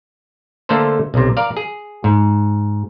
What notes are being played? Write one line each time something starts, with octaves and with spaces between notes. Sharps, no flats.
D3 A3 A#3 A4 C5
B1 C3
A#4 D5 F5
G#4
G#2